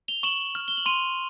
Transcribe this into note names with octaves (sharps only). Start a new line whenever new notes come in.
F7 G7
C#6 E7 F#7
F6
G7
F#7
C6 D#7 F7